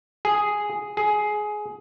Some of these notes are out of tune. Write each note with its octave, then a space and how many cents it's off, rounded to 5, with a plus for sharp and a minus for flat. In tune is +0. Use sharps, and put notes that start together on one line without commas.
G#4 +0
G#4 +15